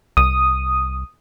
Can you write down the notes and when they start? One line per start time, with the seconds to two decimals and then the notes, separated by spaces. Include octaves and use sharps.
0.17 C2 D#6